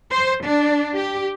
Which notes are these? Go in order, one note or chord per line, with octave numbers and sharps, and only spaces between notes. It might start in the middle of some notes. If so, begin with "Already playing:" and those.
C5
D4
G4